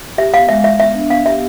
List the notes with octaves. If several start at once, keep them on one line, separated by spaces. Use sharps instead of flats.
G4 E5
B3 F5
G#3 E5
G#3 E5
B3 E5
D4
B3 F5
G4 E5